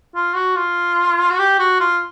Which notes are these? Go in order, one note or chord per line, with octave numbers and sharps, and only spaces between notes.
F4
F#4
F4
F#4
G4
F#4
F4